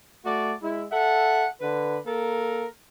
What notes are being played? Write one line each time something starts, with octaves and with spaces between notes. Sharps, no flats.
A3 F#4 D5
G#3 E4
A4 E5 F#5
D3 B4
A#3 A4 A#4